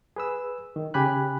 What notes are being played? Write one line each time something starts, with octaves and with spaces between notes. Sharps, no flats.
G#4 B4 E6
D#3
C#3 G4 G#5 B5 F#6